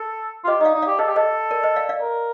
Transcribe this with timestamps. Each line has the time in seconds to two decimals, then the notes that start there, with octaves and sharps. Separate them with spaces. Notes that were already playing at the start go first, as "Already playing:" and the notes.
Already playing: A4
0.44 F4
0.47 G4 C5 D#5
0.60 D#4 D#5
0.65 D5 F5
0.74 D#4
0.82 D5 F5
0.87 G4
0.99 A4 C5 D#5
1.09 G4
1.16 A4 C5 D#5
1.51 A#4 D5
1.63 C5 D#5
1.76 D5 F5
1.89 D5 F5
2.02 A#4